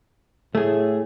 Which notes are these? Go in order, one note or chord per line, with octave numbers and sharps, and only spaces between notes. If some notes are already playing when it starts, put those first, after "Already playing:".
A2 A3 G#4